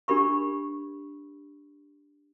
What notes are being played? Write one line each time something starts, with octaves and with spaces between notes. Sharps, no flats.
D4 G4 A#4 B5 C#6